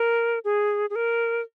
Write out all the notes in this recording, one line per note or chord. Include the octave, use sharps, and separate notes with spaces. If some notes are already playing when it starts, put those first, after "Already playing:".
Already playing: A#4
G#4
G#4
A#4